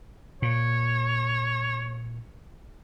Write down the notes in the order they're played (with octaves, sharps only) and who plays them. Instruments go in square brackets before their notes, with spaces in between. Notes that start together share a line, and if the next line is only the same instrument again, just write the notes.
[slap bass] A#2 [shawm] C#5